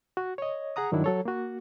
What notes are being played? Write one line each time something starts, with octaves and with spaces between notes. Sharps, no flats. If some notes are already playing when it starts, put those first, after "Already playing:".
F#4
C#5 D#5
G#4 F#5 A#5 D#6
G2 D#3 F#3 D4 E4
F#3 A4 C#5
A#3 F#4